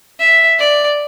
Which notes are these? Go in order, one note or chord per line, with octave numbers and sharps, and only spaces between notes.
E5
D5